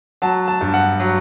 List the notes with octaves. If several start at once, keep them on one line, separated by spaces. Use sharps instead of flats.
F#3 A5
A5
G2
F#5
F#3